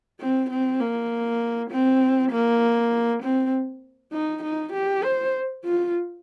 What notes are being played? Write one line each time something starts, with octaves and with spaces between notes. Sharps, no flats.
C4
C4
A#3
C4
A#3
C4
D#4
D#4
G4
C5
F4